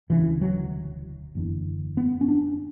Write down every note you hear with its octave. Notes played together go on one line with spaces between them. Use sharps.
E1 D2 C#3 E3
F#3
F#1 E2 D3
B3
C#4
D4